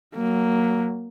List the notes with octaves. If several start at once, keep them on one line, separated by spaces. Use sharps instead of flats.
F#3 A#3